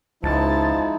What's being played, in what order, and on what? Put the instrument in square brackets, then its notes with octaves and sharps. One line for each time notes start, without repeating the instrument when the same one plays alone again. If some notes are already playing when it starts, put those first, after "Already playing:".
[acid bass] C#2 [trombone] F3 [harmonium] G#3 D#4 E4 [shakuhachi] A5